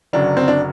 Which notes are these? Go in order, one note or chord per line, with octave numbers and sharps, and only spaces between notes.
F#1 F#2 D3 F#3 D4
C4
D4